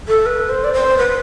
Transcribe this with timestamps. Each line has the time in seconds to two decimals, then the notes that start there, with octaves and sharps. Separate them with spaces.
0.08 A4
0.26 B4
0.50 C5
0.64 D5
0.73 C5
0.98 B4